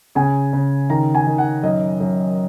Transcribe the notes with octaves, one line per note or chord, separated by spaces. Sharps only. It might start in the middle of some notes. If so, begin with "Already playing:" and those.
C#3 G#5
C#3
D#3 A#5
G#5
D#3
F#5
F#2 D#5
F#2